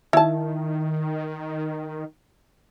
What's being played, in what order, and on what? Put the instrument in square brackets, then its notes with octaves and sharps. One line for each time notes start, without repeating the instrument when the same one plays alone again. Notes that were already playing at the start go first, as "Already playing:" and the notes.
[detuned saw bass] D#3 [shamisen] E4 A5